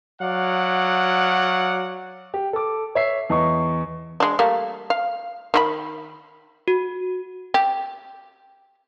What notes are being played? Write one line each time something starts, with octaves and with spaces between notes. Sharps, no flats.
F#3 D5 F5 F#5
G4
A4 D6
C#5 E5 C7
E2 D#5 C#6
G#3 D4
G3 A3 A#3
F5
D#3 F4 B5
F#4
G4